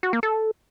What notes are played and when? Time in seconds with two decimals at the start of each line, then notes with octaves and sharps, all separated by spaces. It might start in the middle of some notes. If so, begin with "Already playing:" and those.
0.03 F#4
0.13 A#3
0.23 A4